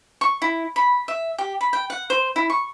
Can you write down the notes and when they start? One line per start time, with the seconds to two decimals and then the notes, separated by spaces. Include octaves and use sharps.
0.21 C#6
0.42 E4
0.76 B5
1.08 E5
1.38 G4
1.61 B5
1.73 G5
1.90 F#5
2.10 C5
2.36 E4
2.50 C#6